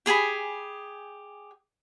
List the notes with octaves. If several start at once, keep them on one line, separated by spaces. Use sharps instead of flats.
G4 G#4 G#5 B5